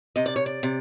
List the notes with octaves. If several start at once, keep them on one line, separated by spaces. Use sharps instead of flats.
C3 D#5
D5
C#5
D5
C3